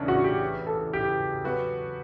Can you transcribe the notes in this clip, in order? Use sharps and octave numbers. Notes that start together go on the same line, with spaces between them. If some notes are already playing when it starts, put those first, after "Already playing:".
Already playing: E2 C#3 E3 A3 C#4 D4
F#4
G4
A4
G4
F#3 B3 F#4 B4